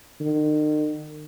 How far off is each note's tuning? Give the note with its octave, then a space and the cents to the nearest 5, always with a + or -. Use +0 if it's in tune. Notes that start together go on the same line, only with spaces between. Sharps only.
D#3 -40